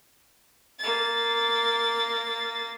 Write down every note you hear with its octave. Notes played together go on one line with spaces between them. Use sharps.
A#3 A6